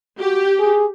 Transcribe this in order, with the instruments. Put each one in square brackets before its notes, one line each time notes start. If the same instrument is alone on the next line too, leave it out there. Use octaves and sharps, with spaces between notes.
[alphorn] F#4 [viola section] G4
[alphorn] G#4